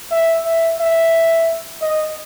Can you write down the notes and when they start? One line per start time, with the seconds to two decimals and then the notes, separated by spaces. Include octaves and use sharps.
0.11 E5
0.45 E5
0.80 E5
1.82 D#5